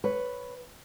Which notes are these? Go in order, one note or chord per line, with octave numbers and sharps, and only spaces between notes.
B4 C#5